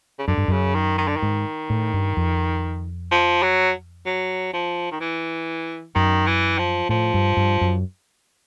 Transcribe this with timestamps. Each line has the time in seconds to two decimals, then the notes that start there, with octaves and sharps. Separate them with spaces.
0.19 C#3
0.27 F#2 D3
0.38 G2
0.48 F#2 C#3
0.75 D#3
0.98 D#3
1.08 D3
1.17 D#3
1.22 G#2
1.70 A2
1.94 G2
2.17 F2
3.11 F3
3.43 F#3
4.06 F#3
4.53 F3
4.92 D#3
5.00 E3
5.95 F#2 D#3
6.27 E3
6.58 F3
6.89 A2 F3
7.14 G2
7.37 G2
7.61 F#2